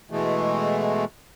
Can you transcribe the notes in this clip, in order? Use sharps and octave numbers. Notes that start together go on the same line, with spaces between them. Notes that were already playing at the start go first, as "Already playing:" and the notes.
B2 E3 G#3 A3